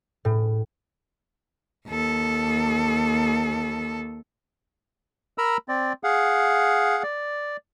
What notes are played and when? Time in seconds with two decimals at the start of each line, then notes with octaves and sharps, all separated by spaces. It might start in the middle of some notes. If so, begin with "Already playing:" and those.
0.25 A2
1.88 D#2 A4
5.38 A#4 A#5 B5 E6
5.68 C4 D5
6.04 G#4 F5 F#5
7.03 D5